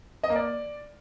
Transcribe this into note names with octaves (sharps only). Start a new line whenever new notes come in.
D#5
A#3
D5